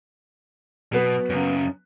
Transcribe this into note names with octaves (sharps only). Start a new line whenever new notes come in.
B2 F#3 B3 B4
F#2 C#3